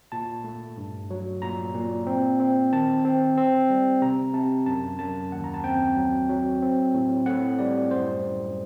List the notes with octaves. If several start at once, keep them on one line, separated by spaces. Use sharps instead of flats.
A#2 A5
A3
G2
F#3
A#2 A#5
A#2
C4
C4
D#3 A5
C4
C4
G3
C3 A#5
C3 A5
F#2 A5
F#2 A5
D#2 F#5
A#5
A5
C4 G5
F#3
F#3
C4
A2
A2 F#5
G3 D5
F#2 C5
F#2